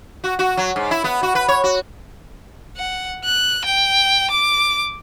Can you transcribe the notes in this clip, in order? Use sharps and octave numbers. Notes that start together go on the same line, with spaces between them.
F#4
F#4
F#3
G#2
E4
B3
F#4
B4
C#5
F#4
F#5
F#6
G5
D6